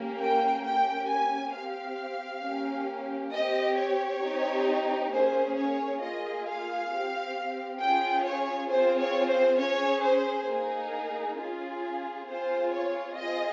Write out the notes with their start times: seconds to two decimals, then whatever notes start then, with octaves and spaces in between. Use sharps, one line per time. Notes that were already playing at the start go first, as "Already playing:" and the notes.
Already playing: A#3 C#4 G4
0.20 G5
0.64 A#3 C#4 G4 G5
1.09 G#5
1.54 C4 G4 F5
2.43 A#3 C#4 G4
3.33 C4 G4 D#5
3.77 C#5
4.22 C4 D#4 G4
5.12 A#3 C#4 G#4 C5
5.56 C#5
6.01 A#3 F4 G#4 D#5
6.46 F5
6.90 C4 G4
7.80 C#4 F4 G#4 G5
8.25 C#5
8.69 C4 F4 G#4 C5
9.00 C#5
9.29 C5
9.59 C#4 G#4 C#5
10.04 C5
10.49 A#3 D#4 G#4
11.38 C#4 F4 G#4
12.27 C4 F4 G#4 C5
12.72 C#5
13.17 C4 F4 G#4 D#5